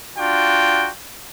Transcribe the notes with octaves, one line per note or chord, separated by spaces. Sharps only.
D4 F4 F#4 G5